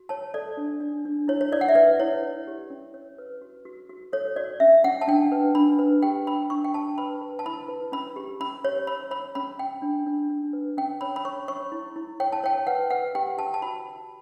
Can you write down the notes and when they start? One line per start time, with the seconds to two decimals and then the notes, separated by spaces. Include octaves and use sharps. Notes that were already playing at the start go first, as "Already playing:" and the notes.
Already playing: F#4
0.09 C#5 A5
0.34 A4 D5
0.57 D4
0.80 D4
1.05 D4
1.28 E4 C#5
1.41 C#5
1.52 E4 D5
1.61 F#5
1.69 E5
1.75 B4 D5
1.99 E4 C#5
2.23 C#5
2.47 G4
2.70 C#4
2.94 C#5
3.18 B4
3.42 F#4
3.65 F#4
3.90 F#4
4.13 A4 C#5
4.36 F#4 D5
4.60 C#4 E5
4.84 C#4 F#5
5.01 A5
5.08 D4 G5
5.32 B4
5.55 D4 B5
5.79 B4
6.03 G4 G5
6.26 D4 B5
6.50 D4 C#6
6.64 G5
6.74 D4 A5
6.98 B4 B5
7.21 B4
7.39 A5
7.46 E4 B5
7.68 B4
7.92 C#4 B5
8.16 G4
8.40 C#4 B5
8.64 G4 C#5
8.87 C#5 B5
9.11 C#5 B5
9.35 C#4 B5
9.59 C#4 G5
9.82 D4
10.07 D4
10.30 D4
10.53 B4
10.77 C#4 G5
11.01 C#5 B5
11.16 B5
11.25 C#5 C#6
11.48 C#5 C#6
11.72 E4
11.96 E4
12.20 C#5 G5
12.32 A5
12.44 C#5 G5
12.67 B4 F#5
12.90 B4 F#5
13.15 G4 G5
13.38 G4 A5
13.54 A5
13.62 F#4 B5